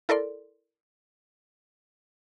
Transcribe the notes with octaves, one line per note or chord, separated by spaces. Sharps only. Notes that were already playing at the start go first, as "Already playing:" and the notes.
E4 A4 A#4 D5 C6